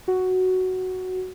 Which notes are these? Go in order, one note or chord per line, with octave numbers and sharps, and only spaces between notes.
F#4